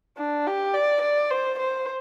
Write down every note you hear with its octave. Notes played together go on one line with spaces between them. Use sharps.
D4
G4
D5
D5
C5
C5